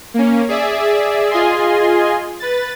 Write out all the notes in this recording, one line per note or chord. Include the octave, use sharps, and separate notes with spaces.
A#3 C#4
G#4 D5 E5
F4 G#4 D#5 G#5 C6
B4 A6